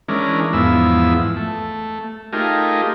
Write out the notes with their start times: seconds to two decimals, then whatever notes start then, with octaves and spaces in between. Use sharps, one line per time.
0.08 E3 G#3 C#4 D4 A#4
0.53 E2 G#2 F3 B3 E4 E6
1.36 A3
2.33 A3 D#4 F4 G4 G#4 A#4